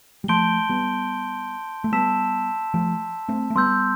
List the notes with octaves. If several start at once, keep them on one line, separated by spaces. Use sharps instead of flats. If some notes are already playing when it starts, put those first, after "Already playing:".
G3
F3 A3 A5 C6 G6 D7 G7
G3 B3
A3
G3 B3 A5 E6 B6 E7
F3 A3
A3 C4
A3
G3 B3 C6 E6 G6